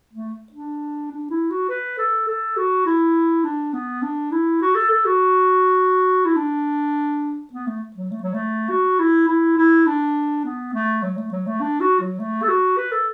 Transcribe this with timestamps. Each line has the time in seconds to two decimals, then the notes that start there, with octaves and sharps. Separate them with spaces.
0.13 A3
0.52 D4
1.11 D4
1.30 E4
1.50 F#4
1.69 B4
1.98 A4
2.28 A4
2.57 F#4
2.86 E4
3.44 D4
3.73 B3
4.03 D4
4.32 E4
4.61 F#4
4.75 A4
4.90 A4
5.05 F#4
6.25 E4
6.36 D4
7.53 B3
7.67 A3
7.96 F#3
8.11 A3
8.22 F#3
8.34 A3
8.70 F#4
8.99 E4
9.28 E4
9.57 E4
9.86 D4
10.45 B3
10.73 A3
11.02 F#3
11.17 A3
11.32 F#3
11.47 A3
11.61 D4
11.81 F#4
12.00 F#3
12.19 A3
12.42 A4
12.49 F#4
12.77 B4
12.92 A4